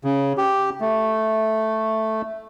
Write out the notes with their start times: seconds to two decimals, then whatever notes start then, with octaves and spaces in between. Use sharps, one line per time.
0.04 C#3
0.38 G4
0.81 A3